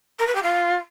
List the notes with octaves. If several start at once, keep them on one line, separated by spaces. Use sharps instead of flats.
A#4
B4
G4
F4